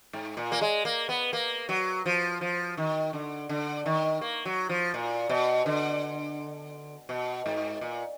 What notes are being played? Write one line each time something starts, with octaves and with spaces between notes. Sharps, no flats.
G#2
A#2
A#3
G#3
A#3
B3
A#3
F#3
F3
F3
D#3
D3
D3
D#3
A#3
F#3
F3
A#2
B2
D3
B2
G#2
A#2